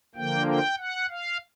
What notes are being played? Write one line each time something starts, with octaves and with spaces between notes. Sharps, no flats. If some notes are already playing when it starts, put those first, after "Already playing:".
D3 F3 A#3 G5
G5
F#5
F5